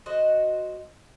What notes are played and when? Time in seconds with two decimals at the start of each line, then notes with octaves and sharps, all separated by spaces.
0.06 F#4 C5 D#5